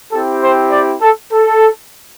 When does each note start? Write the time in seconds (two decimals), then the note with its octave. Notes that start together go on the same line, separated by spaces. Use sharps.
0.11 C4 E4 G4 A4
0.41 C5
0.70 D5
1.01 A4
1.31 A4